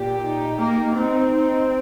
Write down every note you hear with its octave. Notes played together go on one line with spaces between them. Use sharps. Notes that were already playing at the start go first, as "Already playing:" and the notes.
Already playing: A#2 G4
D#4
A#3 D#4
C4 D#4
D#4